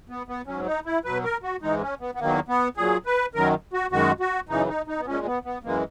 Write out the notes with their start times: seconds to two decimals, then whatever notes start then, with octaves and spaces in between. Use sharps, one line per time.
0.09 B3
0.28 B3
0.47 G#2 F#3 C#4
0.66 D#4
0.86 E4
1.05 B2 F#3 B4
1.24 A#4
1.43 F#4
1.62 G#2 E3 G#3 D#4
1.81 C#4
2.01 B3
2.15 B3
2.20 E2 D#3 F#3 A#3
2.48 B3
2.77 A#2 F#3 G#4
3.06 B4
3.34 F#2 D#3 F#3 A#4
3.73 F#4
3.92 F#2 D#3 G#3 F#4
4.20 F#4
4.49 F#2 C#3 E3 D#4
4.68 D#4
4.88 D#4
4.99 B3
5.06 A#2 G#3 C#4
5.25 B3
5.45 B3
5.64 F#2 E3 G#3 A#3